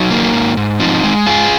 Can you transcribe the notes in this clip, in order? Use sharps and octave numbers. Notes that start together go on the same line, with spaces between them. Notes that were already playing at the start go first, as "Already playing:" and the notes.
Already playing: F#3 D#4
A#3
G#2
G#2
F3 C4 D#4
G#3
G#2 F4 G#4